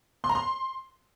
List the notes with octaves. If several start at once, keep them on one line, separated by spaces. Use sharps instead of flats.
C6
A#5
C6